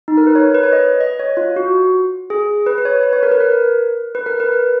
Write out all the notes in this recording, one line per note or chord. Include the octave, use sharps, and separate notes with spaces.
D#4
A#4
B4
C#5
B4
C#5
D#5
D#5
C#5
F4
F#4
G#4
B4
B4
C#5
B4
C#5
A#4
B4
A#4
B4
A#4
B4